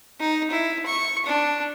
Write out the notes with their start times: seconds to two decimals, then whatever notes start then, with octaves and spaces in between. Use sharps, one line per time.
0.20 D#4
0.51 E4
0.86 C#6
1.26 D4